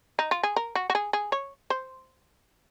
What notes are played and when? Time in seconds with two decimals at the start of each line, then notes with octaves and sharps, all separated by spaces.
0.19 D#4
0.31 F4
0.43 G#4
0.56 A#4
0.75 F#4
0.90 F#4
0.95 G#4
1.13 G#4
1.32 C#5
1.70 C5